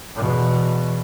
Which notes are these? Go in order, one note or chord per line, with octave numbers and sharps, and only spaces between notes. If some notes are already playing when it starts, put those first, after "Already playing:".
E2 B2